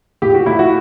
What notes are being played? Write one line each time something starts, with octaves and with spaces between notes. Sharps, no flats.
A2 G4
F#4
A2 E4
F#4